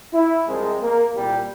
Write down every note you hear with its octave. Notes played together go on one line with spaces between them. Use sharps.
E4
C2 C3 F3 G#3
A#3
C2 A#2 G3